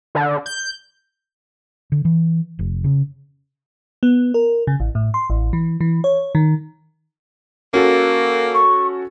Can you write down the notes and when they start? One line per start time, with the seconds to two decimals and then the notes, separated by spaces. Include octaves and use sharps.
0.15 D3
0.46 G6
1.92 D3
2.05 E3
2.59 F1
2.84 C#3
4.03 B3
4.34 A#4
4.67 C#3
4.80 A1
4.95 A2
5.14 C6
5.30 A1
5.53 E3
5.81 E3
6.04 C#5
6.35 D#3
7.74 A#3 C#4 F#4 A4
8.54 C#6